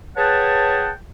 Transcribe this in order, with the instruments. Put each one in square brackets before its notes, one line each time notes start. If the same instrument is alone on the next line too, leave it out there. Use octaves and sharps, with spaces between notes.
[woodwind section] G#4 B4 C#5 F#5 G5 A5